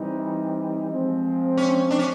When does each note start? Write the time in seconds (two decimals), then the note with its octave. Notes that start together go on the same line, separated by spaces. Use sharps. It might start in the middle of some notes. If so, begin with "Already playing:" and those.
Already playing: E3 G3 C4 D#4
0.90 F3 G#3 C4
1.57 C#4
1.91 D4
1.99 C#4